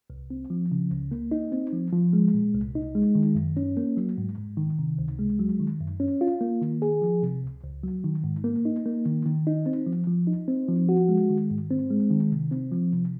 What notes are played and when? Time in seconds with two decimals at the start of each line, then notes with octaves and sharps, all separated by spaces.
0.10 C2
0.30 C4
0.50 F3
0.72 C#3
0.91 C#2
1.11 A#3
1.31 D#4
1.52 C4
1.72 F3
1.93 F3
2.13 G#3
2.34 A#2
2.54 C2
2.75 D#4
2.95 G#3
3.15 D#3
3.35 F#2
3.57 C#4
3.77 A#3
3.97 F#3
4.18 G#2
4.38 G#2
4.58 D#3
4.79 C3
4.98 C#2
5.19 G#3
5.39 F#3
5.60 D#3
5.80 F#2
6.00 C#4
6.21 F4
6.41 A#3
6.62 D#3
6.82 G#4
7.02 F3
7.23 C3
7.43 C#2
7.64 C#2
7.83 F#3
8.04 D#3
8.24 G#2
8.44 A#3
8.65 D#4
8.86 A#3
9.06 D#3
9.25 D#3
9.47 D#4
9.66 C4
9.86 F3
10.07 F3
10.27 D#4
10.48 C4
10.69 F3
10.89 F#4
11.09 G#3
11.29 D#3
11.51 G#2
11.71 C4
11.91 G#3
12.11 D#3
12.31 C3
12.51 C4
12.71 F3
12.93 C3